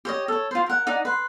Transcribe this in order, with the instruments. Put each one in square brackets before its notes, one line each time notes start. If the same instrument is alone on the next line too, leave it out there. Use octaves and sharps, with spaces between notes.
[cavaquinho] G4 C#5 D#5
A4 C#5
F4 C5
A#4 F#5
D#4 D5 F#5
B4 C6